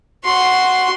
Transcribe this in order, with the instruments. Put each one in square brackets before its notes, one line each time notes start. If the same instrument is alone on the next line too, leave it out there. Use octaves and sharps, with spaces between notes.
[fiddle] F#4 C6